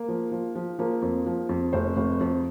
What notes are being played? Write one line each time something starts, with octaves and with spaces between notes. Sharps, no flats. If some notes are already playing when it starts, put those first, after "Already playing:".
Already playing: A#3
F3
F3
F3
F3 A#3
F2
F3
F2
F1 C5
F1
F2